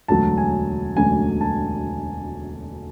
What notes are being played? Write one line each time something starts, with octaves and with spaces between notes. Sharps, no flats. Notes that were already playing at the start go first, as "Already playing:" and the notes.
E1 D2 D3 F#3 A5
G#5
E1 D2 D3 F#3 G#5
A5